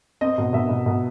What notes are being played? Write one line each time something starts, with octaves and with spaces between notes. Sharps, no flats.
C4 D#5
B2
B2 E5
B2
B2